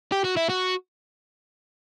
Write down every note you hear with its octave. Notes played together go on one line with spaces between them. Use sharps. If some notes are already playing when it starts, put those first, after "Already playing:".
G4
F#4
E4
F#4